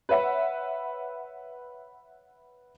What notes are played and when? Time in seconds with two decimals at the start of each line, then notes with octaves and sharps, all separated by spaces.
0.09 B4 C#5 E5 F#5